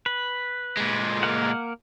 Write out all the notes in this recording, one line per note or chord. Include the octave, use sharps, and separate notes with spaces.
B4
A#2 G#3
A#3 A#4 F#5